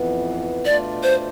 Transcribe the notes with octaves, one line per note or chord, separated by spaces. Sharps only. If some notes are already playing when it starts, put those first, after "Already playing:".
Already playing: F2 E3 B3
B2 A3 D4 F4 D5
C5